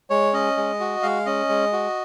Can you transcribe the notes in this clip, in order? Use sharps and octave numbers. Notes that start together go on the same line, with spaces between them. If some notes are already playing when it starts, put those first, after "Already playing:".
G#3 C#5
C#4 D#5
G#3
F#4
G#3 F5
C#4 D#5
G#3
F#4